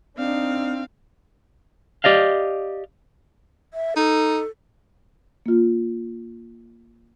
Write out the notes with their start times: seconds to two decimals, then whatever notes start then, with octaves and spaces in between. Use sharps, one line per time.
0.18 C4 D4 D#4 F5
2.04 G4 D5 D#5 F5
3.74 E5
3.97 D#4 A4
5.46 A#3 F4